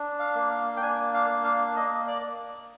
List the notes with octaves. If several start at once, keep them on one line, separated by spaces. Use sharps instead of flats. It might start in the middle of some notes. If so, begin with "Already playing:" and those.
Already playing: D4
F5
A#3
F5
G5
D4 G#5
F5
A#3
F5
A#3 D#5
D5